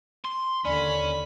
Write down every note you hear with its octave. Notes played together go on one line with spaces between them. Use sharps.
C6
D#2 D3 C#4 D5 B5